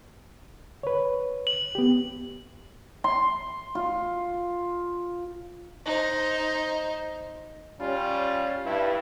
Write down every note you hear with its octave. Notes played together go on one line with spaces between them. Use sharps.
B4 C#5
F#7
B3 G4
C6
F4
D#4 C5
G3 C#4 F4
G2 E4